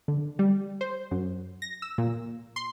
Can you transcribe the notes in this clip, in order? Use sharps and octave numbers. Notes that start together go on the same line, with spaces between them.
D3
G3
C5
F#2
A#6
E6
A#2
C6